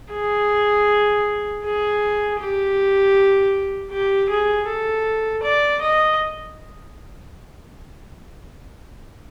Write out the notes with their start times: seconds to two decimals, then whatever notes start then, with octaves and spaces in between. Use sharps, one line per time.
0.13 G#4
1.64 G#4
2.40 G4
3.91 G4
4.30 G#4
4.67 A4
5.43 D5
5.81 D#5